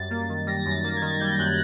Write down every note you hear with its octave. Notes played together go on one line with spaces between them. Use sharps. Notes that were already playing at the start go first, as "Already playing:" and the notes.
Already playing: F#2 G3 A6
A#3
D#3
G3 A#6
F#2
A6
A#3
A6
G#6
D#3
G3 G6
F#2 F#6